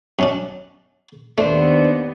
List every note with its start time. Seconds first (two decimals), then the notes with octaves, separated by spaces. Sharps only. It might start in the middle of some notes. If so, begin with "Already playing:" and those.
0.19 F#2 C#4 D4
1.38 D#2 A3 B3 D4 C5